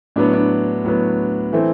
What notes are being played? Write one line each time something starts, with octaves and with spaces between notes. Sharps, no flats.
A2 F#3 B3 D4
D4
A2 F#3 B3
E3 A3 C4